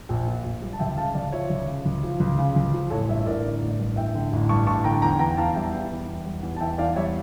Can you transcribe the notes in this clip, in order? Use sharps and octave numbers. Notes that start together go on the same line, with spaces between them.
A#1
A#2
A#1
G3
A5
C#2 E5 G5
C#3 F5 A5
C#2 D5 F5
F3 C#5 E5
C#2
C#3
C#2
F3
C#2
C#3
C#2
F3
A1 A4 C#5
G2 C#5 E5
E5
A1 A#4 D5
D3
A1
G2
A1 E5 G5
D3
A1
G2 A5 C#6
A1 A5 C#6
D3 G5 A#5
E2 G5 A#5
E3 G5 A#5
E2 F5 A5
G3 E5 G5
E2
E3
E2
G3
E2
A5
E3 E5 G5
E2 D5 F5
G3 C#5 E5